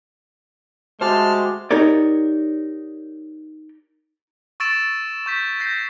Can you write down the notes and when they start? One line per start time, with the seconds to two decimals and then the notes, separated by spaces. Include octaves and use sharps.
1.01 G#3 A3 F#4 G4 C5 A5 C6 F6
1.71 D#4 G4 A#4 C#5 D5
4.60 C#6 E6 A6 D7 E7
5.26 C#6 G6 B6
5.60 G6 A#6 C7